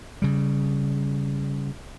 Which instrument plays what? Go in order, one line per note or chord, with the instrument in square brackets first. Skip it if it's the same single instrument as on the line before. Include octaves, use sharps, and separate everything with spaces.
[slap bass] C#3 G3